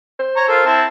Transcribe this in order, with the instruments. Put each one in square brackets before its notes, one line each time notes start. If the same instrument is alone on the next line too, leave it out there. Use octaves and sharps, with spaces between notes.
[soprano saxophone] C5
[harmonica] C#5 A#5
F4 A4 A#4
C4 E4 A5